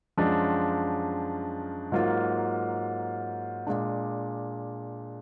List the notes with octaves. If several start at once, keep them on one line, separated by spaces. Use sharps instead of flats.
F#2 F3 G#3 D4 F4
G#2 F#3 A#3 F4
A#2 G#3 D4